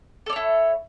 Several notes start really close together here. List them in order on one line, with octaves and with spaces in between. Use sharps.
A4 D5 C#5 E4